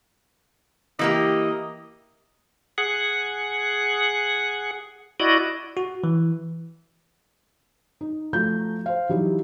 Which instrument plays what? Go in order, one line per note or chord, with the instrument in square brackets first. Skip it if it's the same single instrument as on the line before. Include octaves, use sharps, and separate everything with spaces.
[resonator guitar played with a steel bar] E3 A#3 G4 [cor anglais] D#5
[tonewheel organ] G#4 F#5
E4 F#4 D5 D#5
[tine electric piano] F#4
E3
[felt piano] D#4
F3 A3 F#4 A#5 G6
C5 F5
E3 F#3 G3 D#4 E4 G4